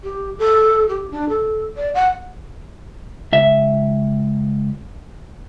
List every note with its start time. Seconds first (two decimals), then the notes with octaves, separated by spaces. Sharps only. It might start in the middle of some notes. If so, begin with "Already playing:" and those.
0.04 G4
0.39 A4
0.89 G4
1.11 D4
1.29 A4
1.77 D5
1.94 F#5
3.33 C#2 E5